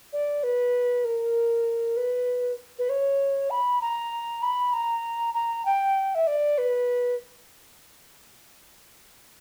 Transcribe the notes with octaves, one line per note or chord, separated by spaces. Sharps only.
D5
B4
A#4
B4
B4
C#5
B5
A#5
B5
A#5
A#5
G5
E5
D5
B4